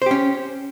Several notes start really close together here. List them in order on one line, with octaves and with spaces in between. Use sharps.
C5 G4 C#4